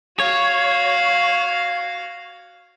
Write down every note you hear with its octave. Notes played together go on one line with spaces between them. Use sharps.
F#4 C#5 F5